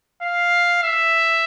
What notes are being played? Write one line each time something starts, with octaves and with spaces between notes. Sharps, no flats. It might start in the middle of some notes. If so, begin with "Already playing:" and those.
F5
E5